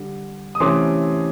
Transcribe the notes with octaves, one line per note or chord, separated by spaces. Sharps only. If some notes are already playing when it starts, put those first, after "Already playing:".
Already playing: D3 G3
D#6
C3 E3 A3 C#4 C6 D6